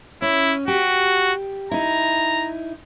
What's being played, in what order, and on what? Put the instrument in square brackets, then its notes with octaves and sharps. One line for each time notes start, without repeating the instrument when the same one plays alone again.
[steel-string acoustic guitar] C#4 [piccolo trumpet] E4
[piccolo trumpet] F#4 [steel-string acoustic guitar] G4
[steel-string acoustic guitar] D#4 E4 [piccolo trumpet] A#5